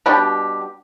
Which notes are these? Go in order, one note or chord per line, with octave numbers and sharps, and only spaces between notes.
B2 G3 D4 G4